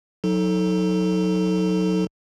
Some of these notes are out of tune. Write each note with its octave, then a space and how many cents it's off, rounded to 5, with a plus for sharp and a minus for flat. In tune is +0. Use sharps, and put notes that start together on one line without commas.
F#3 -25 D#4 +25 A4 +0